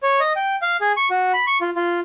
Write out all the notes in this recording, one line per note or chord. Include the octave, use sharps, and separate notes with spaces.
C#5
D#5
G5
F5
G#4
C#6
F#4
B5
C#6
F4
F4